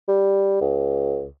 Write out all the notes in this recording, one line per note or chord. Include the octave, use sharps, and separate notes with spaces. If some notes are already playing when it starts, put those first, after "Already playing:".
G3
C#2